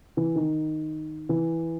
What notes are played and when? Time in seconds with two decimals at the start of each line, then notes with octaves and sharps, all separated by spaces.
0.17 E3
0.35 D#3
1.29 E3